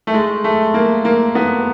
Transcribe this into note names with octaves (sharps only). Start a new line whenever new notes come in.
A3
G#3
A3
A#3
A#3
B3